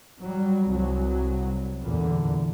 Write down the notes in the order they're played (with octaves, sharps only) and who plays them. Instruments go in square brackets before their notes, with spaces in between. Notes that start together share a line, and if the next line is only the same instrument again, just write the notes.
[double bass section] F#3 G3
C2 F#3
E2 A#2 D3